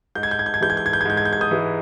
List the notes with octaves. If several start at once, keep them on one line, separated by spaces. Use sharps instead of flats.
G#2 G6
G#6
G6
G#6
G6
G#6
E3 G#3 G6
G#6
G6
G#6
G6
G#6
G#2 G6
G#6
G6
G#6
D#6 G6
E3 G#3